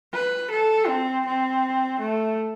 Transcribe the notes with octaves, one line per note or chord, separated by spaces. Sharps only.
B4
A4
C4
C4
A3